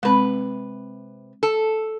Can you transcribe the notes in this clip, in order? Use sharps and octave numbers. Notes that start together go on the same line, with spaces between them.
C3 G#3 C4 B4
A4